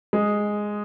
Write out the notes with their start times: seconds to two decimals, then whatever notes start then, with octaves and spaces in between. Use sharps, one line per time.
0.13 G#3